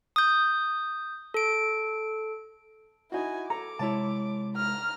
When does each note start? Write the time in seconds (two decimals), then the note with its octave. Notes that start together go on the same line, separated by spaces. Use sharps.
0.16 D#6 G6
1.34 A4 D7
3.12 D#4 E4 F#4 G#5
3.50 A4 A#5 D6
3.79 C3 G#3 E4 C#5 A5
4.56 A#5 F6